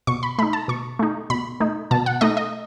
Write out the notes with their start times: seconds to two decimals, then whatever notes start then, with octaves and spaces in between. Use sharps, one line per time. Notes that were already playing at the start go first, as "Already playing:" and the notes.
0.07 B2 C#6
0.23 B5
0.38 A3 B5
0.42 D#4
0.53 A5
0.68 B2 C#6
0.99 A3 D#4
1.30 B2 B5
1.60 A3 D#4
1.91 B2 A5
2.06 F#5
2.21 A3 D#4 D#5
2.37 D#5